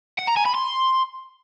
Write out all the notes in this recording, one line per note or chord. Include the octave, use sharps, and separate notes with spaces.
F#5
A#5
G#5
B5
C6